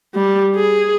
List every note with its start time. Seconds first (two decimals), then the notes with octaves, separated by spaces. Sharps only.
0.15 G3
0.56 G#4